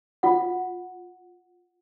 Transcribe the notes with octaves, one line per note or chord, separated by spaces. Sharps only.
F4 F#5